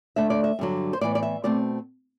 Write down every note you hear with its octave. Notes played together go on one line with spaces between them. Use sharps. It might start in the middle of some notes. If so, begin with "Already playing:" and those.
D2 D3 A3 D4 E5
D5
E5
G2 D3 F#3
C5
A2 E3 B3 D5
D5
E5
B2 A3 C4 D5